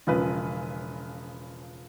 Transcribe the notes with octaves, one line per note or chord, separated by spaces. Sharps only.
E1 C#3 F3 B4